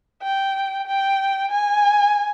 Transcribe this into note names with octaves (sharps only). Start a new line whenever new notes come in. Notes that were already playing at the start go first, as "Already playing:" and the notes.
G5
G5
G#5